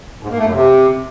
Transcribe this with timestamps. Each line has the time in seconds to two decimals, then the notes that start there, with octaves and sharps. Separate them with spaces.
0.23 G#2
0.30 A#3
0.38 A3
0.46 F#2
0.53 C3